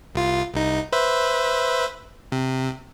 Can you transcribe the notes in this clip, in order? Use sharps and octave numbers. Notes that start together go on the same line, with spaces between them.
C2 F4
C2 D#4
B4 C5 E5
C3